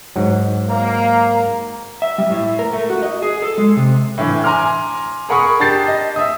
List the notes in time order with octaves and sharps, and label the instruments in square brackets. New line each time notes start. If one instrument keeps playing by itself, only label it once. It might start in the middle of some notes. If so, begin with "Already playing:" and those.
[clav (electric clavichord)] G#2 F#3
[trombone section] A#3 [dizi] A#5
[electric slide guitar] E5
G3
A2
A#4
A3
F#4
D#5
G#4
A4
G#3
C3
[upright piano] A2 D3 E3
G#5 A#5 C6 D6 F6
G#4 A#4 F#5 B5 C#6 D#6
D4 G4 A5 G6 A6 C7
D#5
E5 D#6